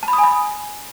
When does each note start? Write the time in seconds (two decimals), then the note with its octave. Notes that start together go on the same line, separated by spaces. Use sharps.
0.03 A5
0.08 B5
0.13 D#6
0.18 G#5
0.24 B5